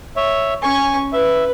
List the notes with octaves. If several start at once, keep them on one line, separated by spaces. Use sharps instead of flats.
C#5 E5
C#4 G#5 C#6
B4 E5